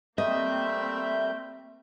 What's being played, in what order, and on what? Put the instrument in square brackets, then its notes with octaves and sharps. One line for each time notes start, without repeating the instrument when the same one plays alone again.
[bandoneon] G3 A3 G6 [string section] A#3 C4 [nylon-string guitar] D#5 [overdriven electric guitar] E5